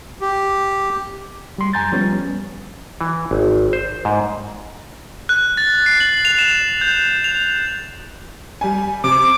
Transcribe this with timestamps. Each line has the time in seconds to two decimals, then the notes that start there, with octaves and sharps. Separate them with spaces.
0.21 G4
1.58 G3 C6
1.73 F#2 G#5 A#5 G6 A6
1.92 F3 G3 B3 C#4
3.01 E3
3.31 G#1
3.73 C5
4.05 G#2
5.29 F#6
5.57 A6
5.86 C7
6.00 F#7
6.25 F7
6.39 E7
6.81 G6
7.24 F7
8.61 G3 G#5
9.04 C3 D6